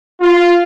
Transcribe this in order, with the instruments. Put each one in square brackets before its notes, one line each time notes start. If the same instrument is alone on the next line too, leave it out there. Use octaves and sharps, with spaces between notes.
[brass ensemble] F4